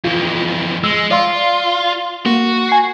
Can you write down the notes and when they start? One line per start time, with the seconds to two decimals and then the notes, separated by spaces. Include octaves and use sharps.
0.05 F2 E3 F4
0.84 G#3 E6
1.11 F4 D5 F5 C6
2.26 A#3 F#4
2.69 G#5 C7